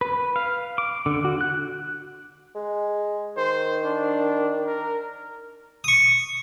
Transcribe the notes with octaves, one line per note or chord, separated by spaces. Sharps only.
B4
F5
D6
D3
F#4
F#6
G#3
D#3 C5
D4
A#4
C#6 D#6